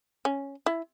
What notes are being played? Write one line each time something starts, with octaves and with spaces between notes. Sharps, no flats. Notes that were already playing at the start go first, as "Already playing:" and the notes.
C#4
E4